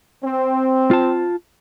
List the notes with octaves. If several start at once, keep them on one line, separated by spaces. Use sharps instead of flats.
C4
F4 A5